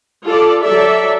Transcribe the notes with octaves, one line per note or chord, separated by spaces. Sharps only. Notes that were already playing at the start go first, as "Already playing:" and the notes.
F4 A4 D5
F#3 A4 D5 E5